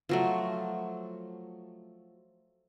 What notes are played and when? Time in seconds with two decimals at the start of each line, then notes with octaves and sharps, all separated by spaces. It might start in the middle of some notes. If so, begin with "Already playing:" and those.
0.09 F3 F#3 A3